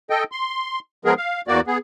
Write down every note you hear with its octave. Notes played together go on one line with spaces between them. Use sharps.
A4 D#5 G5
C6
F3 G#3 B3 G#4 A#4
F5
E2 A#3 F#4 D5
B3 G#4